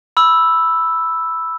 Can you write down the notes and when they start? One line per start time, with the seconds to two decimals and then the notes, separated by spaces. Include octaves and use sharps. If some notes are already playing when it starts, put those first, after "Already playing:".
0.17 B5 E6